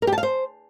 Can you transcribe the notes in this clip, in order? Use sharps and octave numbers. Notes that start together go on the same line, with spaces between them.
A#4
G4
A5
F5
C5